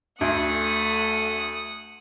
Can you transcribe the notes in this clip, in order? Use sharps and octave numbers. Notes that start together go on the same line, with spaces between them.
D2 A3 F#5 D#6